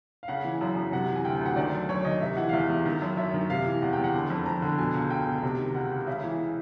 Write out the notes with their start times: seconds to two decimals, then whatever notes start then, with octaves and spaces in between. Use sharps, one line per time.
0.23 F5
0.28 C#3 F#5
0.44 E3
0.61 F#2
0.76 F#2
0.92 C3 F#5
1.09 E3
1.16 G#5
1.25 D2 G5
1.36 G5
1.41 D2 F#5
1.56 D#3 D5
1.73 F#2
1.89 F#2 C#5
2.05 D#3 D#5
2.21 C3 E5
2.37 E3 F#5
2.49 F5
2.53 E2 E5
2.70 E2
2.86 D#3
3.02 F#2
3.17 F#2 E5
3.34 D#3
3.50 C3 F5
3.66 E3
3.82 E2 F#5
3.93 G5
3.98 E2
4.04 F#5
4.14 D3
4.30 F2
4.46 F2 A#5
4.62 D3
4.78 B2 G#5
4.94 C#2
5.10 C#2 G5
5.27 B2
5.43 C3
5.59 D#3
5.74 C#2 F#5
5.91 C#2
6.07 C#3 E5
6.24 E3